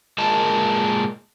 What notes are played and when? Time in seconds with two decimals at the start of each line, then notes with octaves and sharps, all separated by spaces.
0.18 A#2 G#3 A#4 A5